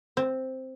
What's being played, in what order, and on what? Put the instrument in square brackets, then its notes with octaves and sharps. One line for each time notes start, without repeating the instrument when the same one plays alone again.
[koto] C4